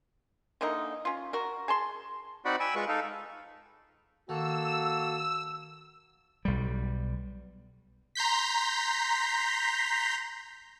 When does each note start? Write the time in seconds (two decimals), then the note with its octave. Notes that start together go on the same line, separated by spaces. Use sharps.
0.61 D3 E3 A#3 D#4
1.05 C#4 F4
1.33 F#4 A#4
1.68 G#4 A5 C6
2.45 C4 D#4 F#4 D5 F#5 B5
2.60 G5 G#5 B5 E6
2.75 G#3 F4 B4 C#6
2.88 D#4 A4 F5
4.29 D#3 A#3 F#4 A4 E6
6.45 B1 G3
8.15 A#5 C6 G6 B6